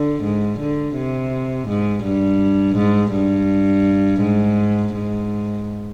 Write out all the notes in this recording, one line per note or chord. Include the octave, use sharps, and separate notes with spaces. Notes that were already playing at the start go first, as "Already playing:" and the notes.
Already playing: D3
G#2
D3
C3
G#2
G2
G#2
G2
G#2
G#2